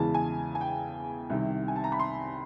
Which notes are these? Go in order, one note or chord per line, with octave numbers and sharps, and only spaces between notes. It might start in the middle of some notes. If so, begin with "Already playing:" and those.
Already playing: E2 C#3 E3 G#3 A5
G#5
G#5
G5
C2 C3 D#3
G#5
A5
A#5
B5
C6